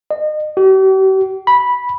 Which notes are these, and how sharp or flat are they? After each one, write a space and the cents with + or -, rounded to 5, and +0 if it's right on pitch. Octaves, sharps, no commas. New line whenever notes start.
D#5 -30
G4 -45
B5 -10